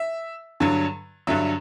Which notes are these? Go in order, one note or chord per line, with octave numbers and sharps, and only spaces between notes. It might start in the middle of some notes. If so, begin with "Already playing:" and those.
Already playing: E5
G2 D3 F#3
G2 D3 F#3 E5